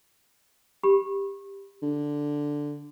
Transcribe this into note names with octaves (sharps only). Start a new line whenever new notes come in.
G4 B5
D3